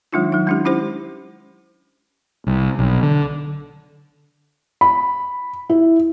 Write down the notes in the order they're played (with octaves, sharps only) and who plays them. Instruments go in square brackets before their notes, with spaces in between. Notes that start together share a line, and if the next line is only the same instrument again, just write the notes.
[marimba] D#3 F#3 G#3 D4 D#4 F4
F#3 D#4
G#3 C#4 D4 E4 G4
C#4 E4 G4 C5
[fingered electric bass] C2
B1
D3
[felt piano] B5
E4